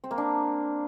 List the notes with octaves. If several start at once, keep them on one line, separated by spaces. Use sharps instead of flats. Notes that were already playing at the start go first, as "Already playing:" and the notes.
C4
A#3
D4